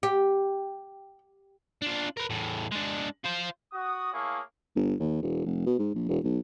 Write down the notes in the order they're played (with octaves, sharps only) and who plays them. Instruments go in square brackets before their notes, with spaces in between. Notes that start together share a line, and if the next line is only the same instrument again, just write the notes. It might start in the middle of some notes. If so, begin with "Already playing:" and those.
[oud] G4
[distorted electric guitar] D4 F4
A#4 B4
E2 A2
G#3 D4
F4 C5
[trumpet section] F#4 D#6
A3 A#3 E4 G#4 C#5 F5
[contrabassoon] G1
D#2
E1
F1
B2
G#2
A#1
E1
B1